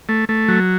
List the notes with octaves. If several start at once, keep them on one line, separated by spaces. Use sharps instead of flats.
A3
A3
F#3